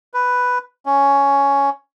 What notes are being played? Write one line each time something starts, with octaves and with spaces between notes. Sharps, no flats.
B4
C#4